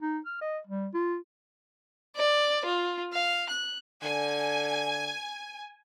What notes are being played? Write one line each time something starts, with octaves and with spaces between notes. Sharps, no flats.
D#4
F6
D#5
G3
F4
D5
F4
F5
F#6
D3 G#5